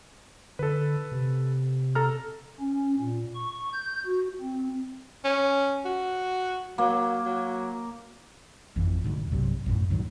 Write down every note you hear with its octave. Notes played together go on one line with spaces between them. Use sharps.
D3 A4 B4
C3
A4 A#5 F6
C#4
A#2
C#6
G6
F#4
C4
C#4
F#4
F#3 A#3
F#3
G#1 F2 E3
D#1 D2 G#2
B1 G2 C3 F#3
A1 F#2 A2
C2 G#2 D#3 F#3